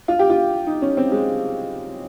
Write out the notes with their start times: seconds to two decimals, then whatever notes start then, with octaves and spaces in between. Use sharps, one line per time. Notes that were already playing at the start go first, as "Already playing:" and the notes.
0.08 F4
0.19 G4
0.30 F4
0.67 D#4
0.82 C#4
0.97 C4
1.12 G#3